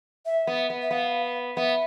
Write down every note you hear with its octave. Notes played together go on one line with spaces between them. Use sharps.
E5
B3
B3
E5
B3 F5
B3 E5